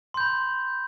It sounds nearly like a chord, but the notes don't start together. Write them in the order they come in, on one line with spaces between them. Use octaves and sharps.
C6 G6 B5